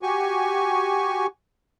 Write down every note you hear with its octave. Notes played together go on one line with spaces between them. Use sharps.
F#4 G4 G#5 C#6